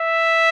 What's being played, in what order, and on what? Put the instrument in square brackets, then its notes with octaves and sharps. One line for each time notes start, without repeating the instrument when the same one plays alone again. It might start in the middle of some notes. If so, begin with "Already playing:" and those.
Already playing: [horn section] E5